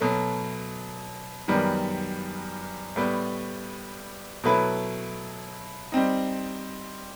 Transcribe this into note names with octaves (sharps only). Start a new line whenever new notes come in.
B2 F#3 A3
F#2 D#3 G3 B3
A2 G3 B3
B2 F#3 A3 E4 B4
G3 C4 D#4